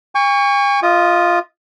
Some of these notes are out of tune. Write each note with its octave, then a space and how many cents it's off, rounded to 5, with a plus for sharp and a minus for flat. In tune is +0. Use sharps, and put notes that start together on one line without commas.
G#5 -45 C#6 +15
F4 +0 D#5 +30 D#6 -20